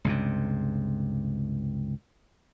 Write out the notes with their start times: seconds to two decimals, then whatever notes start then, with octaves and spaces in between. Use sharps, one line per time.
0.05 C#2 G2 C3